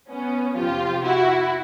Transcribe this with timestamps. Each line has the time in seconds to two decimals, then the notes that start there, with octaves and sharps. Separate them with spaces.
0.09 B3 C#4
0.57 F2 C3 F3 F4 G4
1.04 E4 F#4